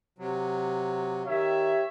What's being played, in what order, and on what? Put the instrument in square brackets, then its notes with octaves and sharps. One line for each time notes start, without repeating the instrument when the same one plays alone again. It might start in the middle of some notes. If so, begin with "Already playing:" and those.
[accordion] C3 F#3
[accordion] D#3 [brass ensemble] G4 C#5 E5